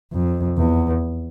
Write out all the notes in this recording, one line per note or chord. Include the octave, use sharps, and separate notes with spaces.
F2
E2